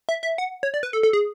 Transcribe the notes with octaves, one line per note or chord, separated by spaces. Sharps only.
E5
E5
F#5
C#5
D5
B4
A4
A4
G#4